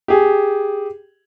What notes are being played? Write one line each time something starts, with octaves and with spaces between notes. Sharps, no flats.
G4 G#4